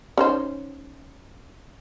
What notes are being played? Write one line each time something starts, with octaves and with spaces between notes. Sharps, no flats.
C#4 D#4 C5